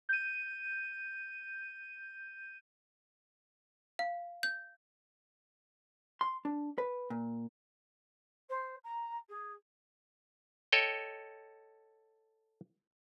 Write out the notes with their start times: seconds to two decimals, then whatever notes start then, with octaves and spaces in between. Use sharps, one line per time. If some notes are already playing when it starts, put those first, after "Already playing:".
0.09 G6 D#7
3.99 F5
4.43 G6
6.21 C6
6.45 D4
6.78 B4
7.10 A#2
8.49 C5
8.84 A#5
9.29 G#4
10.72 A4 C#5 D#5 G5